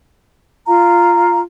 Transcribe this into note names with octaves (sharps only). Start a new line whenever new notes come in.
F4 F5 A#5